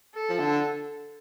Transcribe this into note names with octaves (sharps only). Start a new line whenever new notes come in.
A4
F3
D3